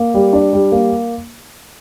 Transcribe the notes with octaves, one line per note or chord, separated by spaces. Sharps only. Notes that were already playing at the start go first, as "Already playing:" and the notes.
Already playing: A#3
G3
D4
G3
A#3